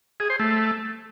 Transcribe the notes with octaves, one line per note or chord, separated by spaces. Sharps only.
G#4
C5
A3